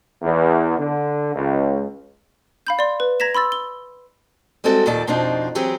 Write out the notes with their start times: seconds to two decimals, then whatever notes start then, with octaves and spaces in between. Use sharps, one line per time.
0.23 E2
0.78 D3
1.35 C#2
2.67 F5 B5 G6
2.79 D5 C6
3.00 B4
3.20 A#5 G#6 A#6 B6 E7
3.35 B5 C6 E6 A6
3.52 G7
4.64 G3 G#3 C4 F#4 A4 D5
4.86 D#2 A#2 D#3 D5 A5
5.07 F2 B2 F3 C4 D4 D#4
5.55 E3 F#3 C4 G4 G#4